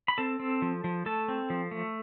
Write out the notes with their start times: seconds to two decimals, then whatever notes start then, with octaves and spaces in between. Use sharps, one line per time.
0.08 B5
0.18 C4 A4 A5
0.40 C4
0.62 F3
0.84 F3
1.06 A3 A4 A5
1.28 C4
1.50 F3
1.71 A3